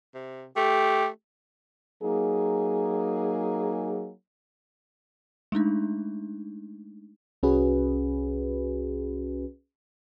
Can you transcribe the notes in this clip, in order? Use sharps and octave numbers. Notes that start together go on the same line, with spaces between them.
C3
A3 G4
F#3 A#3 D#4 G#4
G#3 A3 D4 D#4
C2 C#4 F#4 G#4 B4